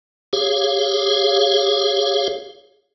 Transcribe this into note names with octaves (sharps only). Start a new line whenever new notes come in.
G4 G#4 C#5 F5